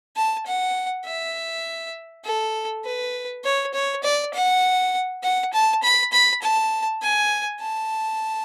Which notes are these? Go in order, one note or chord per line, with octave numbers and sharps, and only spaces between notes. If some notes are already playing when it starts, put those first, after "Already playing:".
A5
F#5
E5
A4
B4
C#5
C#5
D5
F#5
F#5
A5
B5
B5
A5
G#5
A5